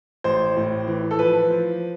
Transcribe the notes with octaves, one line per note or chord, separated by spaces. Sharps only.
A1 C5
A2
E3
A4
F3 B4
F3